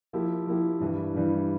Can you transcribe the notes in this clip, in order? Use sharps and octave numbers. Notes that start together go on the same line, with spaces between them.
F3 A#3 E4 G4
F3 A#3 E4 G4
G2 E3 G3
G2 E3 G3